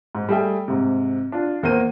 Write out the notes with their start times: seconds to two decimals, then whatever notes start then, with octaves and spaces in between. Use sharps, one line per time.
0.15 G#2
0.29 G3 A3 G#4 E5 G5
0.68 G#2 C3
1.32 D4 F4
1.63 E2 A#3 A#4 C5 D#7